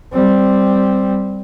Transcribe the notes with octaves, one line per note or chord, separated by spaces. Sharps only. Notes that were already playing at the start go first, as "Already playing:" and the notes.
G3 C4